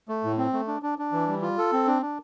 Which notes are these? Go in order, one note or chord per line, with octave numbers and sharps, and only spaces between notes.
A3
A2
C4
A3
D4
D4
D4
E3
G3
F4
A4
C4
D4
D4